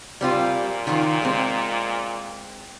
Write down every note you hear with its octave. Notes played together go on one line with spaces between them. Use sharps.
A#2 G3 C4 F4
D#3 F3 F4
G#3 C4